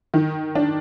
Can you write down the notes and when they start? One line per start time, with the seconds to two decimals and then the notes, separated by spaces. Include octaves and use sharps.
0.14 D#3
0.55 D4